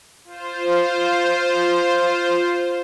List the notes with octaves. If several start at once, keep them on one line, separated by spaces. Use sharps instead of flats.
F4 C5